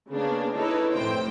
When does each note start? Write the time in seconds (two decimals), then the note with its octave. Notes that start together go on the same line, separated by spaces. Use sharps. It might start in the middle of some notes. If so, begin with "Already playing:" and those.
0.12 C#3 A#3 B3 D4
0.55 D#4 E4 A4 B4 C#5
0.94 F2 A2 C3 C5 G5